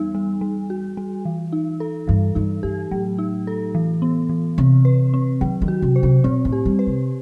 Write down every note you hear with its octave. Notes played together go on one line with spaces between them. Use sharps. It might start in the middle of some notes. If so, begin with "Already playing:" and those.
Already playing: E2 G3 B3 D#4
G3
G3
F#4
G3
E3
D#4
A4
G2 E3
G2 D#4
G2 G4
A2 F#3
D#4
A4
E3
B3
E3
C3 C4
B4
C4
D#3 F#3
D#3
F#4
C3
C5
C3
B2 C4
A2
G4
G3
B4
C3